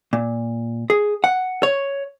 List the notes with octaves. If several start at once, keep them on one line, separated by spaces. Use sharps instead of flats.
A#2
G#4
F#5
C#5